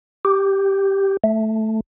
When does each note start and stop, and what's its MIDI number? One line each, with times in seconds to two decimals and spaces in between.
0.25 1.17 67
1.24 1.80 57